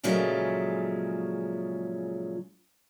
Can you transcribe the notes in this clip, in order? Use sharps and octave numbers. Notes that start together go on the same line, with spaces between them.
A#2 C#3 F3 F#3 G#3 A3